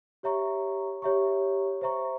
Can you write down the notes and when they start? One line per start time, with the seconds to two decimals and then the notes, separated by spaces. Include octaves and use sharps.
0.23 G4 C#5 E5 A#5 C#6
1.02 G4 C#5 E5 A#5 C#6
1.81 C5 E5 A#5 C#6